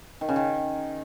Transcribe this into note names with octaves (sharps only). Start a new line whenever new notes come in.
D#3
C#3
D#3